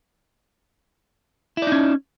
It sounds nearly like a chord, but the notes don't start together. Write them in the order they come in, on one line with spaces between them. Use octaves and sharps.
E4 D5 D#4 C#4